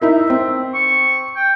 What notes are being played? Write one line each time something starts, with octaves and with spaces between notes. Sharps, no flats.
D#4 E4 A#4 E5
C4
C#6
G5